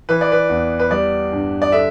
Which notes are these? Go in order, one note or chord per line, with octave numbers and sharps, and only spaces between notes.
E3 B4
D5
B4
E2
B4
G3 D5
G2
D5
D3 E5